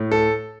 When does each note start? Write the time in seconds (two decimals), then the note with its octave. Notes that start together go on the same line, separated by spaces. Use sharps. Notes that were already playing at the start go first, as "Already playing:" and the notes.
Already playing: A2
0.11 A4